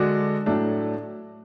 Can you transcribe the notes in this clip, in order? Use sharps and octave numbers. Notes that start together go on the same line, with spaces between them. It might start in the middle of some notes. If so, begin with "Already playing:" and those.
Already playing: D3 G#3 D4 F#4
A2 F#3 A3 D4